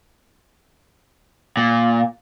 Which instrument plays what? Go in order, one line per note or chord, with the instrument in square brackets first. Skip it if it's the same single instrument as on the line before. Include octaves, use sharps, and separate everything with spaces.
[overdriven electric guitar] A#2